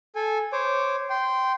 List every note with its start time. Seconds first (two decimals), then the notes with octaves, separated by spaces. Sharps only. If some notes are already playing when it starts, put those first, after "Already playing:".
0.15 A4 G#5
0.53 C5 C#5 D6
1.10 G5 C6